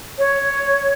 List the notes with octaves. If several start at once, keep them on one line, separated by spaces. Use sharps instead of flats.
C#5